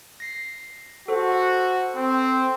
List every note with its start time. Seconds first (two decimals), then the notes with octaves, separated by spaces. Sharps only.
0.20 A#6 C7
1.08 F#4 A4 C5
1.96 C4